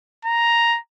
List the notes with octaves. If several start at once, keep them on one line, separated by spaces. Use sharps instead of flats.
A#5